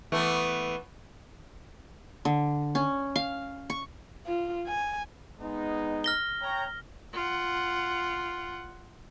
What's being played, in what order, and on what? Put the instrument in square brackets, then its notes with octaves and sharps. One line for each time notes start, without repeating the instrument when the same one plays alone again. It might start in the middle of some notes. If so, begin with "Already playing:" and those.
[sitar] E3 A3 B3
[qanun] D3
C#4
F5
C#6
[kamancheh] F4
G#5
[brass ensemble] G#3 B3 D#4
[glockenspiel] F6 A#6 G7
[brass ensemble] C#5 G5 A#5
[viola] F4 F#5